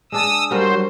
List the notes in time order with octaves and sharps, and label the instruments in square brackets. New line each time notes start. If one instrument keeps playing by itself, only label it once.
[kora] G#3 D4 D5 [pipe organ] D#6 E6
[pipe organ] F#3 C5 [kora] G3 F#4 A#4